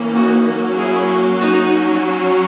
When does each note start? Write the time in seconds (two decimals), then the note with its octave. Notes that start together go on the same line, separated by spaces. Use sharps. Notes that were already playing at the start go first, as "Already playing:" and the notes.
Already playing: E3 A#3 C#4
0.14 D#4 F#4
0.45 F#3 A#3 C#4
0.76 E4 G#4
1.38 D#4 F#4
1.70 F#3 C#4